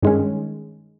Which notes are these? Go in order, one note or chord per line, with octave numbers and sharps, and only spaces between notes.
G2 D#3 G#3 C#4